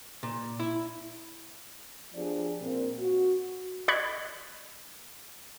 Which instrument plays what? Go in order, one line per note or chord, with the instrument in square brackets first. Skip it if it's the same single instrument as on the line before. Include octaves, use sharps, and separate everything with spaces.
[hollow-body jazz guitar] A#2
E4
[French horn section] F3 B3 D4 G4 G#4 D5
A#2 A#3 C4
F#4
[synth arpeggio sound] D5 D#5 B5 C#6 F#6 G#6